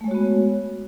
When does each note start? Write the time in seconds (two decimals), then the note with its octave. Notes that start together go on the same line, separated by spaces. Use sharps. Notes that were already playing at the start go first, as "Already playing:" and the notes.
0.01 A3
0.04 G#3
0.08 C#5
0.11 F#4
0.15 B3